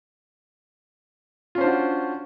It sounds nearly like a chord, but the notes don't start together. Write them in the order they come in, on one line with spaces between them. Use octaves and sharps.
F4 C#4 C5 D4 F#4